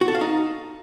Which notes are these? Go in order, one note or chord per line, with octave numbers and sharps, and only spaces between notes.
F#4
A4
F5
D#4